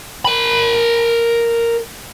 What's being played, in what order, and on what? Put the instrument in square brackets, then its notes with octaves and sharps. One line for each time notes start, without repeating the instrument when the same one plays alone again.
[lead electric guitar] A#4 B5